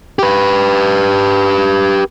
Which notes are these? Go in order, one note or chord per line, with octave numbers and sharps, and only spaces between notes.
G4 B4